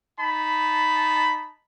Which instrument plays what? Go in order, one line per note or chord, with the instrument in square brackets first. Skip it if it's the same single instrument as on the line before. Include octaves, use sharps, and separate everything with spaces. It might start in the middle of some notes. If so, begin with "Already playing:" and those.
[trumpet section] D#4 A5 B5